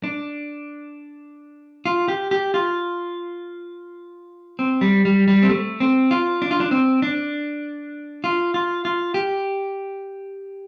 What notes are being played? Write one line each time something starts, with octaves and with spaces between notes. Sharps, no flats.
D4
F4
G4
G4
F4
C4
G3
G3
G3
C4
A3
C4
F4
D4
F4
D4
C4
D4
F4
F4
F4
G4